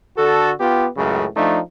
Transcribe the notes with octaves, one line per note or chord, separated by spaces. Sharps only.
D3 F#4 A4
B3 F4 G4
C#2 F#2 A2 C#3
F3 A3 D4 D#4